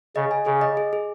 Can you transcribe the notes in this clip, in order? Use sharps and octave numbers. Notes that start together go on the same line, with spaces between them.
C#3 D#5
G#5
C#3 G#4
D#5
G#4
G#4